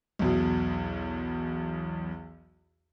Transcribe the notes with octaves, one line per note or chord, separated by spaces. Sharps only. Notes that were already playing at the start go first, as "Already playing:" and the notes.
B1 E2 B2